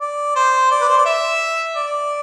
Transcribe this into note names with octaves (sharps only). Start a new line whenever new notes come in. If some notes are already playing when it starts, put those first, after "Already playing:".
D5
C5
D5
B4
C5
D5
E5
D5